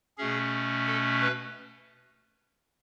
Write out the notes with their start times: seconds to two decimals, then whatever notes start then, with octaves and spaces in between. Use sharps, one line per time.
0.18 B2 A3 C#4 G#4
0.87 A4
1.21 B4